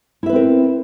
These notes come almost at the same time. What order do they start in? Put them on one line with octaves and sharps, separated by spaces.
E4 E5 B4 C4 A#4